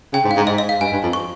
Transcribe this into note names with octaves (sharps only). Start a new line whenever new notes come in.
C#3 G5
G#2
F5
G#2
G#2 D#5
D#5
F5
G2 G#5
G2
F2
C#6